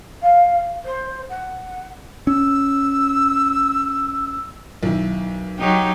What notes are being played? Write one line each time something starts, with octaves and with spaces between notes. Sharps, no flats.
F5
C5
F#5
C#4 E6
B1 D#3 E4
F#3 D#4 G4